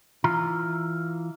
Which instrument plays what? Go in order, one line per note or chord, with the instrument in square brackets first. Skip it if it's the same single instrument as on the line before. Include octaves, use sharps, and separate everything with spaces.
[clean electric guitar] E3 F4 A#5